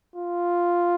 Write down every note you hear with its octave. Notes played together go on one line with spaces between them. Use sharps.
F4